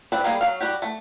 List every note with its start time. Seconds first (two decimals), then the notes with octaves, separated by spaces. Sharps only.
0.12 C4 B4 D5 E5
0.24 G3 A#3 E4 G#4
0.41 F#3 F5
0.61 G3 F#4 G4
0.82 A3